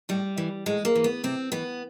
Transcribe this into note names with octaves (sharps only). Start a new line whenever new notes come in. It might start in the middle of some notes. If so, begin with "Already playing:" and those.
A2 G3
E3
A2 G#3
A#3
E3
B3
C3 C4
E3 B3